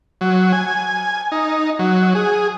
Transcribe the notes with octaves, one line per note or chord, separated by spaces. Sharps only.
F#3
G#5
D#4
F#3
G#4